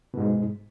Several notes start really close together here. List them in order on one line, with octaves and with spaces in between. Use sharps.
B2 G#2 G#3